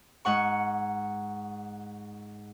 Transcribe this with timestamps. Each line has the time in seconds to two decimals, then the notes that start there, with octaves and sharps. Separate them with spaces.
0.25 G#2 F#5 C#6